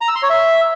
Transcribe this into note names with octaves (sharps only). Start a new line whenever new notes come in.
A#5
E6
C6
C#5
E5